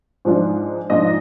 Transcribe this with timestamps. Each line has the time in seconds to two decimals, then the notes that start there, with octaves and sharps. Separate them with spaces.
0.25 G#2 F3 G#3 D4 F4
0.90 G#2 F3 G#3 D4 F4 D#5